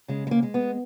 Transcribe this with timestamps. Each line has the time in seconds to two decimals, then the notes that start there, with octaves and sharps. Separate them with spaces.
0.08 C#3 G#3
0.27 G#3
0.31 A#3
0.43 G#3
0.54 B3